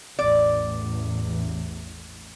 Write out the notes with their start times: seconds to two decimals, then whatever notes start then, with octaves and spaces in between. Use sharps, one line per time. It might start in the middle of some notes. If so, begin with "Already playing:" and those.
0.19 A1 E2 D5